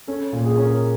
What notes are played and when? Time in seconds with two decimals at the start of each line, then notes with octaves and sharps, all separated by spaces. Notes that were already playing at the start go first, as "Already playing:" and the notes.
0.08 C#4 A4
0.33 A#2
0.45 G#4
0.58 C#4
0.64 A#4